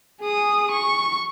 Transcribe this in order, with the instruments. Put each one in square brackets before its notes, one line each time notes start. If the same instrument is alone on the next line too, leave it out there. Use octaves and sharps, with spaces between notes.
[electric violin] G#4 D#6
C#6